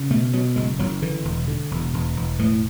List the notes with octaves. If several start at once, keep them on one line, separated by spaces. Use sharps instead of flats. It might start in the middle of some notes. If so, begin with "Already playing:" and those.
Already playing: C#3
B2 A3
B2 F#3
F#1 G#3
F#1 F#3
D3 E3
E1
D3
E1
E1
E1
A2 E3